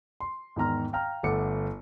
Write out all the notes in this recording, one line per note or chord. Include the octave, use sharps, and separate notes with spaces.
C6
E2 G#2 D#3 A#5 F6
F5 G5 A#5 F6
G1 A3 F#5 D6 C#7